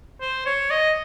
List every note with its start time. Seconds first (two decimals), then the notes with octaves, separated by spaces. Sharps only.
0.21 C5
0.46 C#5
0.71 D#5